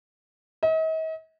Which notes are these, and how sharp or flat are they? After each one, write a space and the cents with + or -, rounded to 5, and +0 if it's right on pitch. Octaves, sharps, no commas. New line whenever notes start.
D#5 +45